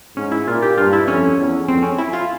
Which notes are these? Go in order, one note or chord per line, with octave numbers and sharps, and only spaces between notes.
G#2 C#4
E4
A#2 F4
G4
G2 F4
E4
F2 C#4
E2
F2 C4
C#4
E4
F4